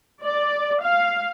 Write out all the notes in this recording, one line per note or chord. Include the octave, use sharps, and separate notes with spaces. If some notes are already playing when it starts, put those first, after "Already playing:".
D5
F5